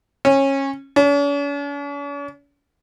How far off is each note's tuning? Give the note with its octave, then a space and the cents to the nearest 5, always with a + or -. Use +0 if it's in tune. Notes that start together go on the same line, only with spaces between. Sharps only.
C#4 -20
C#4 +45